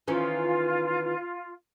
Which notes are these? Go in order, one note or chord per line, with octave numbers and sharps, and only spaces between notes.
D#3 E3 C#4 F4